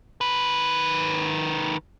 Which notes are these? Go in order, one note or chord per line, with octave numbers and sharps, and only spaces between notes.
D#3 B4